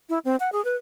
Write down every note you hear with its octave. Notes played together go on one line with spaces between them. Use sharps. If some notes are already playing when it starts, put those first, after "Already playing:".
E4
C4
F#5
G#4
B4